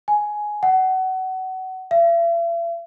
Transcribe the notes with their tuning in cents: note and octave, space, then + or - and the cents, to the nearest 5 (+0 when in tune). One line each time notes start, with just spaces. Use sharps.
G#5 +10
F#5 +25
E5 +45